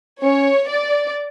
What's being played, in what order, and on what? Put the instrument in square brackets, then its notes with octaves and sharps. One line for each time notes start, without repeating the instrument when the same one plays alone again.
[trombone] C#4 [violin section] C#5
[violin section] D5